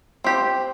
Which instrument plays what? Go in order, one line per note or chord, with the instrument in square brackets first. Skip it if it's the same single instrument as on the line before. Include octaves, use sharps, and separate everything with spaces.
[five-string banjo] C4 G4 C5